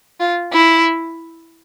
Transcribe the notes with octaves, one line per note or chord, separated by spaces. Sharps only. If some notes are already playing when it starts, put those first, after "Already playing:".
F4
E4